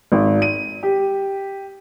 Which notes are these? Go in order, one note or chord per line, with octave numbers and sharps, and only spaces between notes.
G#1
D#7
G4